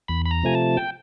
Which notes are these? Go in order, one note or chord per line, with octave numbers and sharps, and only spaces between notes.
E2 B5
B5
A#5
C3 F3 A3 G#5
A5
G5